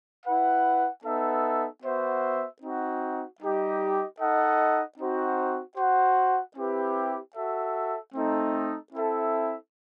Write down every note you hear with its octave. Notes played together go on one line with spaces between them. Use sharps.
E4 B4 F#5
B3 D#4 A4 E5
B3 F#4 C5 E5
C4 D#4 F#4
G3 D#4 G4 D#5
D#4 A4 D#5 F#5
C4 D#4 F#4 C5
F#4 C5 F#5
C4 E4 G4 B4
F#4 A4 E5
A3 C4 D#4 A4
C4 E4 A4 E5